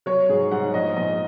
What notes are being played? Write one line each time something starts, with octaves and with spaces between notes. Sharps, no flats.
F#3 C#5
G#2 G#4
G#2 F#5
A#1 D#5
A#1 D#5